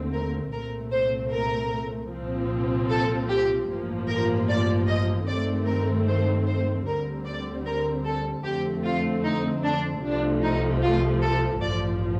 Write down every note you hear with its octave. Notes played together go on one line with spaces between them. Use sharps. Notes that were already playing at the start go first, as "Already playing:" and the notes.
Already playing: D#2 D3 A3 C4
A#4
C2 A#2 A3 C4 A#4
C5
A#4
C2 A#2 F3 C4
A4
G4
A1 G2 F3 A#3
A#4
D5
D#5
G2 D#3 A3 C4 D5
A#4
C5
C5
D2 D3 G3 C4 A#4
D5
A#4
A4
F2 D3 A3 C4 G4
F4
D#4
D4
C2 C3 F3 A3 D4
D#4
F4
A4
A1 G2 F3 D5